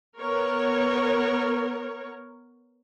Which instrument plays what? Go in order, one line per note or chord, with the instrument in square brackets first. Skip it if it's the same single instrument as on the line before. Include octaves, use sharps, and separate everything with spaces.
[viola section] B3 A#4 C#5